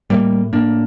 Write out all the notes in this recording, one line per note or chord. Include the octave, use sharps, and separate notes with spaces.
A2 G3 A#3
A2 A#3 D4